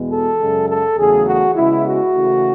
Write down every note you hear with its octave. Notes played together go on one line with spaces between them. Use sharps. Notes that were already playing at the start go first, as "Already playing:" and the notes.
Already playing: E2 B2 G#3 B3
A4
F#2 C#3 G#3
A4
E2 C#3 F#3 A3 G#4
F#4
C#3 G#3 B3 E4
F#4
C#3 E3 A3